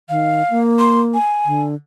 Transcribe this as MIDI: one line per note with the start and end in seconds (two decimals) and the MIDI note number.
0.09 0.42 51
0.09 0.59 77
0.50 1.17 58
0.79 1.01 84
1.14 1.62 80
1.45 1.75 50